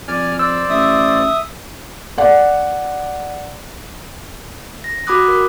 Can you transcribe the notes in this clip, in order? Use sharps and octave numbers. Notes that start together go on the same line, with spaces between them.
F2 D5 G#5 F6
C5 D5 E6
A1 E5 D#6
D5 F#5
A#6
F#4 B5 D6 D#6 F#6
A#4